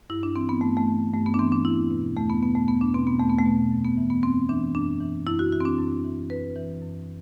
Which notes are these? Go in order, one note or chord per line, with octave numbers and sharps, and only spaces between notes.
G2 E4
D4
E3 C4
B3
G2 A3
A3
E3
G2 A3
B3
D4
E3 C4
D4
E2 E4
B2
E2 A3
B3
B2 B3
A3
E2 B3
D4
B2 C4
B3
E2 A3
B3
A3
B2
F#2
B3
E3
B3
F#2 C4
E3 D4
F#2 D4
E3
F#2 E4
F#4
E3 F#4
C4
D4
F#2
E3
F#2 B4
E3
F#2